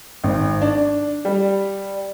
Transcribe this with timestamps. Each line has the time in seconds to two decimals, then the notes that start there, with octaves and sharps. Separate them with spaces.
0.24 G#1
0.61 D4
1.25 G3